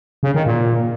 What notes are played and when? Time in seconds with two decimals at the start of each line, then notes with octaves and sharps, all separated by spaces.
0.23 C#3
0.35 D#3
0.46 A#2